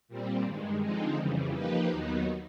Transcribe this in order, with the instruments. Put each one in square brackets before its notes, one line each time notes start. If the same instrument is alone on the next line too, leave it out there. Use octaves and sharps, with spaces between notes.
[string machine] A#2 G3 C4
G2 D#3 G#3
D3 F3 G#3 C4 D#4
F2 C#3 E3 G3
F3 A#3 D#4 G4 B4
D#2 D#3 F#3 B3 D#4